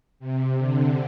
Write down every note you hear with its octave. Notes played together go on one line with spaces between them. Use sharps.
C3
D3